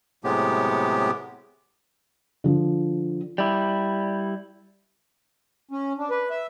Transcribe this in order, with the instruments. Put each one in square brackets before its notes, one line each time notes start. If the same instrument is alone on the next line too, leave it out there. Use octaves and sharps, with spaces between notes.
[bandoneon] A2 C3 F#3 G#3 B3 G4
[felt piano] D3 F3
[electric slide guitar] G3 E4
[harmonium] C#4
D4
B4
E5